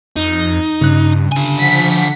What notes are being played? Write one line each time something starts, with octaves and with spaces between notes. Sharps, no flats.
F2 D#4
G2 C#3 F#6
D3 G#5
F3 F#5 B6